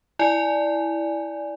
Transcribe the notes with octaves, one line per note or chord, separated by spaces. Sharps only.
E4 D5 G#5